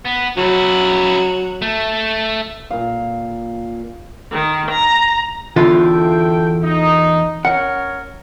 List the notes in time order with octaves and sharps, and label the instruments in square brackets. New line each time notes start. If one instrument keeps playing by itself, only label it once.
[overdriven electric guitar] B3
[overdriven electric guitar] C#3 E4 [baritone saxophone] F#3
[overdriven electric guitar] A3
[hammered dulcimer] A#2 F5
[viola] D#3
A#5
[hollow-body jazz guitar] E2 D3 F4 [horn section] A4 E5 G5
[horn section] D#4
[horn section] C#4 A#4 C#5 [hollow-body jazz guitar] F#5